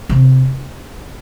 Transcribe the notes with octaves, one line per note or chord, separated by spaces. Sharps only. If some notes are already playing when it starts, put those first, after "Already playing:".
C3